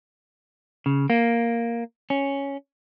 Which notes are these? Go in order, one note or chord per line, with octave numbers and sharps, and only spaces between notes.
C#3
A#3
C#4